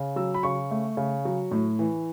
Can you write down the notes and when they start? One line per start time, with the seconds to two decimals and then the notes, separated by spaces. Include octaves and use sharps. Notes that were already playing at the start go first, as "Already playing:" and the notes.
Already playing: C#3
0.16 F#3 E6
0.34 B5
0.43 C#3 C#6
0.71 A3
0.97 C#3
1.25 F#3
1.51 A2
1.79 E3